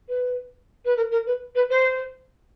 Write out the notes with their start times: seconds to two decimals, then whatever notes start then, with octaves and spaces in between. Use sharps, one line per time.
0.08 B4
0.85 B4
0.96 A#4
1.11 A#4
1.26 B4
1.55 B4
1.70 C5